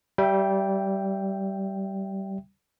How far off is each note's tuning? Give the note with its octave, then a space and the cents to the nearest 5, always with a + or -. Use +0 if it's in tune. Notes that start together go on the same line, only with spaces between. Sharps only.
G3 -20 E5 +5 G5 +0